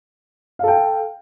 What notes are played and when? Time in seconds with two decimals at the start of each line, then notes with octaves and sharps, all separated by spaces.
0.59 F5
0.64 A4
0.68 G5